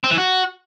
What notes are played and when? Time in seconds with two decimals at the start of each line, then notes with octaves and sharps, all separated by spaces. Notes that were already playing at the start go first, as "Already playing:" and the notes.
0.04 C4
0.11 E3
0.18 F#4